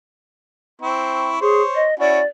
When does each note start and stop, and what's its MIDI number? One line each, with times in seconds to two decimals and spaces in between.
0.82 1.36 60
0.82 1.36 64
0.82 1.36 85
1.41 1.62 68
1.41 1.85 72
1.41 1.85 73
1.75 1.94 75
2.00 2.20 61
2.00 2.20 64
2.00 2.20 66
2.00 2.25 74